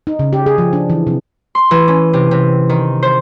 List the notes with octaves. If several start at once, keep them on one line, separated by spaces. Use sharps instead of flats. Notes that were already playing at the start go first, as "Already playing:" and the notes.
D#4
C#3
G4
G#4
F3
D4
E3
C3
C6
E3
C#4
C3
C3
D#3
C5